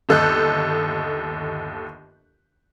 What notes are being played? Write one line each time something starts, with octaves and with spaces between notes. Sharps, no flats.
G1 D#2 A4 D#5 F#6 G6